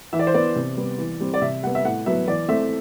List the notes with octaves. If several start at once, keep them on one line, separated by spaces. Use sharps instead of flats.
E3 E5
D5
C5
B3 D5
C3
G3 B3
E3
G3 C4
D5
C3 E5
G3 B3 F#5
E5
A2 F#5
F#3 B3 E5
E3 D5
A3 C4 E5